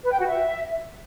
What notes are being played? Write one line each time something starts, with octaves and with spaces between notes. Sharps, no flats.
B4
G5
F#4
E5